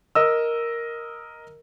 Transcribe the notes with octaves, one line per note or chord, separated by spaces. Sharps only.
A#4 D#5 E6